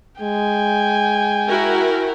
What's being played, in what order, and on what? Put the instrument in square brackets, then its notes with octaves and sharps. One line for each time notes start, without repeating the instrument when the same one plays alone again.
[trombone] G#3 [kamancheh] G5 G#5
[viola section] E4 F#4 A#4